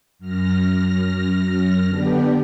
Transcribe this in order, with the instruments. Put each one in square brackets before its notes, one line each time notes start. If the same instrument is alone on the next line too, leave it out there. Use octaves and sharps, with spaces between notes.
[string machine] F#2 F6 A#6
D3 B3 D4 G4